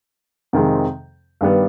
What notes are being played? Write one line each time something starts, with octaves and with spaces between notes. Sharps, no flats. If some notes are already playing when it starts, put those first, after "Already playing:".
F2 C3 D#3 G#3 C4
G2 D#3 G3 B3